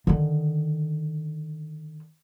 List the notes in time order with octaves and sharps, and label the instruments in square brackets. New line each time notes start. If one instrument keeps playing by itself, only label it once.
[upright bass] D3 D#3